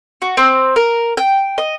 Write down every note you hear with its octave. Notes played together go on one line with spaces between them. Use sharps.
F#4
C4
A#4
G5
D#5